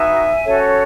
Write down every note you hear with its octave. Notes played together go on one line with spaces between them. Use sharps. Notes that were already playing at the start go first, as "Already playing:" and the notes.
Already playing: D#4 F#4 B4 E5 G#5
C#4 F#4 A4 C#5